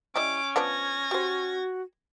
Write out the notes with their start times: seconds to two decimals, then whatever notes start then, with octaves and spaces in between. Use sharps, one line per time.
0.16 G3 C#4 E4 D#5 D6
0.56 F3 B3 D4 G#6 A#6
1.11 F#4 G4 C5